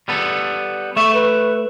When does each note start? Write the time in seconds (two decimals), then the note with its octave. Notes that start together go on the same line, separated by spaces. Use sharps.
0.08 G3 B3 A4
0.97 A3 E5 C#6
1.14 B4